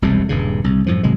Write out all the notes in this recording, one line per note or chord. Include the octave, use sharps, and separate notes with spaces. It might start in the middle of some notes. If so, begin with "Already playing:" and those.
E1 C2 F2 C3
D#1 G2 C#3
C2
F#2 A2 F3
G#1 C3 F#3 G#3